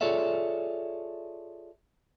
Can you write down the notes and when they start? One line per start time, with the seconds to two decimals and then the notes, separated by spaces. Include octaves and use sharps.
0.01 F4 G#4 A4 C#5 D5 E5